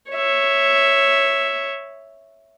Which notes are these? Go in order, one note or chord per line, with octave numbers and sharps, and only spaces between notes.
C#5 E5